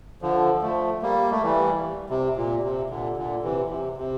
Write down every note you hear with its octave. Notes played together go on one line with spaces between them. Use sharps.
D3 F3
F3 A3
G3 A#3
A3
E3 G3
C3
A#2
C3
A#2 D3
A#2 D3
C3 E3
C3
C3